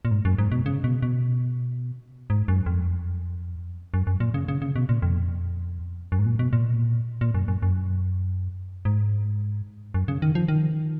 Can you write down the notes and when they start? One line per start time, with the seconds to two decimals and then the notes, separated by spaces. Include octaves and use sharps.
0.05 A#2
0.11 G#2
0.25 F#2
0.38 G#2
0.52 B2
0.66 C#3
0.84 B2
1.02 B2
2.30 G#2
2.48 F#2
2.66 F2
3.94 F#2
4.07 F#2
4.20 A#2
4.34 C#3
4.48 C#3
4.62 C#3
4.76 B2
4.89 A#2
5.02 F2
6.12 F#2
6.19 G#2
6.26 A#2
6.39 B2
6.53 A#2
7.21 A#2
7.34 F#2
7.48 F#2
7.62 F#2
8.85 G#2
9.94 F#2
10.08 C#3
10.22 D#3
10.35 F3
10.48 D#3